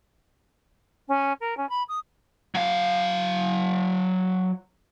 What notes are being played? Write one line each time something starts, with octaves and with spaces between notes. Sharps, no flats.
C#4
A#4
C#4
B5
D#6
F#3 F5